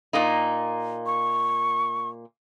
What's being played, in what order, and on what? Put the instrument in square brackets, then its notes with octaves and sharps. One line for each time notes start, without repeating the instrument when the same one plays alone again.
[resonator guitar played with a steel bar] A#2 A#3 D#4
[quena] C#6